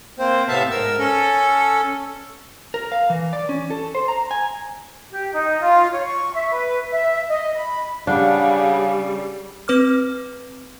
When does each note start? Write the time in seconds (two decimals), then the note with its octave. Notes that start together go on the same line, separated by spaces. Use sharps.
0.19 A#3 C4 C5
0.48 A2 C3 B3 E5 F5 A5
0.71 G#2 A#4 E6
0.99 C#4 A4
2.74 A#4
2.92 F5
3.10 E3
3.33 D5
3.49 C#4
3.70 A4
3.95 C5
4.08 A#5
4.31 G#5
5.10 G4
5.33 D#4
5.60 F4
5.91 C#5
6.05 C#6
6.32 E5
6.50 B4
6.90 E5
7.28 D#5
7.55 B5
8.07 C#3 G3 D4 F5 F#5
9.68 C4 B4 D6 F6